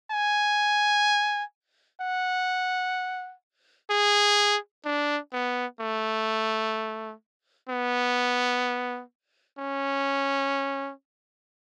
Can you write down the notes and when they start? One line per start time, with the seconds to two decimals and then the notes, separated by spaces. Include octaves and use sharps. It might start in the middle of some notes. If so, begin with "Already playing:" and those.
0.11 G#5
2.01 F#5
3.90 G#4
4.85 D4
5.33 B3
5.81 A3
7.69 B3
9.59 C#4